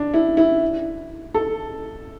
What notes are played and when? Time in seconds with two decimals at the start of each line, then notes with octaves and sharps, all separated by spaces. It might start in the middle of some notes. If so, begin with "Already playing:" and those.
Already playing: D4
0.14 E4
0.37 E4
1.35 A4